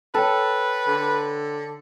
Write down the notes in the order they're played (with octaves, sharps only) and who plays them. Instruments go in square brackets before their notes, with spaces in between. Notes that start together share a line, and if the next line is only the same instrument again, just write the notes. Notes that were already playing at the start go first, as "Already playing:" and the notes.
[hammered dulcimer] A4 [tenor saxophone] B4 [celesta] C#5 G5 A5
[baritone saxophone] D3